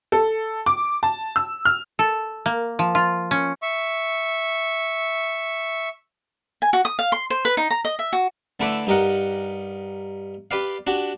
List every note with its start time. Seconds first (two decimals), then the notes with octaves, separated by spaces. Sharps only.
0.12 A4
0.66 D6
1.03 A5
1.36 E6
1.65 F6
1.99 A4
2.46 A#3
2.79 F3
2.95 F4
3.31 C#4
3.62 E5 C#6
6.62 G#5
6.73 F#4
6.85 D#6
6.99 F5
7.12 C6
7.30 C5
7.45 B4
7.57 D#4
7.70 A#5
7.85 D#5
7.99 E5
8.13 F#4
8.60 D3 A3 E4 A4 B4 D6
8.87 G2 D#4 G4 A#4 F#5
10.51 G4 B4 D5 F5
10.87 D4 F#4 G4